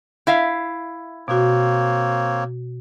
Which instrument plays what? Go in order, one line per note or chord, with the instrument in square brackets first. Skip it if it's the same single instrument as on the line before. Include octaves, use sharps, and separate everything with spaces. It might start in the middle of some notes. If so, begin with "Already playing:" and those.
[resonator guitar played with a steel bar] E4 E5 F5
[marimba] B2 F#4 [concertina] A#3 C4 C#5